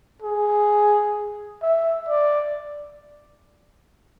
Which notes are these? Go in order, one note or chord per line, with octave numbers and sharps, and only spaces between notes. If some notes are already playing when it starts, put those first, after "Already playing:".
G#4
E5
D5